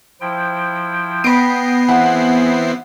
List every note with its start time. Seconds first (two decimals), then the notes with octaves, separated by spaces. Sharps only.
0.21 F3 E4 G5
1.24 B3 D#5 G5 B5 C7 D7
1.89 E3 C4 E4 G#4 F#5 B5